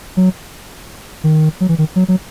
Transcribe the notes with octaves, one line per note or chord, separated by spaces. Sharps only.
F#3
D#3
F#3
E3
D#3
F#3
F#3